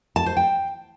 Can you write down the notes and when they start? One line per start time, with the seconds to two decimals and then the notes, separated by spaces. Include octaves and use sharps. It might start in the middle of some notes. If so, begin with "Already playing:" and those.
0.16 A5
0.26 C5
0.37 G5